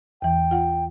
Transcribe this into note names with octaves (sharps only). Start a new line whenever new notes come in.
E2 E3 G5
F4 F#5